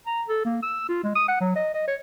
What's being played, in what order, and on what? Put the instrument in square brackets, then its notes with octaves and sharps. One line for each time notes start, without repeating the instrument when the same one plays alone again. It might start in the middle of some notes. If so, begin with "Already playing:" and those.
[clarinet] A#5
A4
A#3
E6
F4
G#3
D#6
F#5
F#3
D#5
D#5
C#5